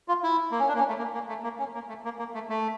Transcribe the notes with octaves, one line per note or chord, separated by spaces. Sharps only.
F4
E4
A#3
C#4
D4
A#3
C#4
A3
A#3
A#3
A3
A#3
C#4
A#3
A3
A#3
A#3
A3
A3